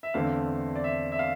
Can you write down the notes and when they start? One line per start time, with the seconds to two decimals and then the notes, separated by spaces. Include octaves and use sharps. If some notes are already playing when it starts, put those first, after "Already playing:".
0.03 E5
0.14 E2 D3 A3 C4 F5
0.76 D5
0.84 E5
1.12 E5
1.19 F5